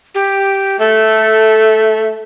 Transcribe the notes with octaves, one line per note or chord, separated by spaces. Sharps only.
G4
A3 A4